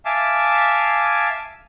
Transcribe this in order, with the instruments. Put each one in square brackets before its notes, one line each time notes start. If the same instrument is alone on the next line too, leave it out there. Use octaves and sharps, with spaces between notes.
[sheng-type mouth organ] E5 F5 G#5 A5 D6